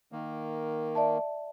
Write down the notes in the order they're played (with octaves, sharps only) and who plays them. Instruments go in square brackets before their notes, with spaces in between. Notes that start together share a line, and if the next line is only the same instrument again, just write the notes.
[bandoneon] D#3 A#3
[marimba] D5 E5 A5